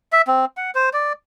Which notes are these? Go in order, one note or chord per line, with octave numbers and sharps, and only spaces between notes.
E5
C4
F#5
C5
D5